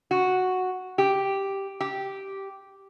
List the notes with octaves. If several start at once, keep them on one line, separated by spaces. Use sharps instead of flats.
F#4
G4
G4